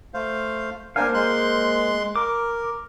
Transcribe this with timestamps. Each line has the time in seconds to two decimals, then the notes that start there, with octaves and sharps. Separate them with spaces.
0.14 A3 C5 F5
0.96 A#3 D4 A#4 C5 F5 G#5
1.14 G#3 C6 F#6
2.16 A#4 D6